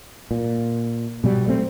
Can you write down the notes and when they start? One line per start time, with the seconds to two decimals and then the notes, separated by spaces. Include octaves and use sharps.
0.31 A#2
1.24 B2 F#3 G3
1.48 A3 C4